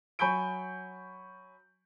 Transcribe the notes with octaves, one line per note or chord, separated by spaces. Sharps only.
F#3 G#5 B5 C#6 G6 D7